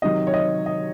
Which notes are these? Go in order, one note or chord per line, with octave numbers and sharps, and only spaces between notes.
C3 D#3 F#3 D#5
C#5
D#5
D#5